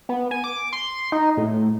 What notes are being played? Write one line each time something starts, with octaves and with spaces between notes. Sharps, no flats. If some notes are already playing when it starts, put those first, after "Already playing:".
B3
G#5
D6
C6
D#4
A2